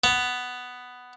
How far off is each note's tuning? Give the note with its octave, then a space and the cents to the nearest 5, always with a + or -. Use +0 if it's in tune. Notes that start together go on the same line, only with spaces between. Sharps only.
B3 +10